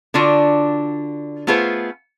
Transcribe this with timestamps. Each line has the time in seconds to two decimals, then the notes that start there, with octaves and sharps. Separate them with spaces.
0.14 D3 D4 F4 F#4
1.47 A3 B3 F4 G#4 B4 C5